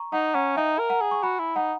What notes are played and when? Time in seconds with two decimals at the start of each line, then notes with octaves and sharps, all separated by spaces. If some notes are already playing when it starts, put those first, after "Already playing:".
Already playing: A#5 C#6
0.12 D#4 F#5 A#5
0.34 C#4 F#5 A#5
0.56 D#4 E5 G#5
0.79 A#4
0.90 F#5 A#5
1.01 G#4
1.11 C#6
1.23 F#4 G#5 B5
1.39 E4
1.56 D#4 F#5 A#5